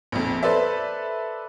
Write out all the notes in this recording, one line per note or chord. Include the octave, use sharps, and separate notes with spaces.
A#1 F2
A4 B4 C5 D5 E5